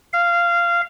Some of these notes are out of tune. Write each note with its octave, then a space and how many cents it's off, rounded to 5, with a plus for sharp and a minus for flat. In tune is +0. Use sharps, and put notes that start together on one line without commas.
F5 -15